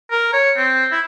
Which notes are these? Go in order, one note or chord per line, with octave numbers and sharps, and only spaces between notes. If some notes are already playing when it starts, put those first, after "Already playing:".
A#4
C#5
C4
E4